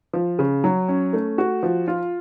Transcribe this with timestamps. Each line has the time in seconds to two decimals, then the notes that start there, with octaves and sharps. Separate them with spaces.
0.13 F3
0.39 C#3
0.64 F#3
0.88 C#4
1.13 A3
1.38 F#4
1.63 F3
1.88 F4